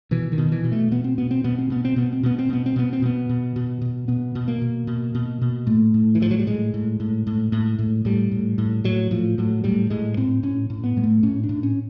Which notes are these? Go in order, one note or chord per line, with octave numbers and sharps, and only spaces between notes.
B2 E3
D#3
B2
E3
B2
A3
B2 B3
C4
B2 B3
C4
B2 B3
C4
B2 B3
C4
B2 B3
C4
B2 B3
C4
B2 B3
C4
B2 B3
C4
B2 B3
B2
B2
B2
B2 B3
B2
A#3
B2
B2
B2
B2
A2 A3
A2
E3
A2 F3
F#3
G3
A2 G#3
A2
A2
A2
A2
A2
A2 G3
A2
A2
A2 F#3
A2 F3
A2 F#3
A2 G3
A2 G#3
A2 C4
A2 C#4
A2
B3
A2 G#3
A3
A2 C#4
D4
A2
C#4